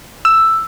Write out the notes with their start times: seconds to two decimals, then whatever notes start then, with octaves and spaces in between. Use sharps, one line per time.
0.25 E6